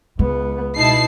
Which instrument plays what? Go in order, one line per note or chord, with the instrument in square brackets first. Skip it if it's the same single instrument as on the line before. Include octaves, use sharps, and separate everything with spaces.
[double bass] C#2 B3 [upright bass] G#3
[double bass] B2 D#4 [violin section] E4 A5 C7